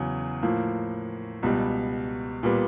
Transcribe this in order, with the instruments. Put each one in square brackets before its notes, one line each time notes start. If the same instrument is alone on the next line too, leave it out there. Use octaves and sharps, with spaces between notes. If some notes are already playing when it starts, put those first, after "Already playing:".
Already playing: [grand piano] E2 C#3 F#3
A2 F3 A#3
C#2 B2 G3
A#2 G3 B3